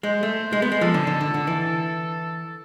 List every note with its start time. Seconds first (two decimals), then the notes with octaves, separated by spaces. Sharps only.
0.03 G#3 C5
0.23 A3
0.53 G#3
0.62 B3
0.72 G#3
0.81 F3 A4
0.94 D3
1.07 D3
1.21 D3
1.34 D3
1.47 E3
1.60 A4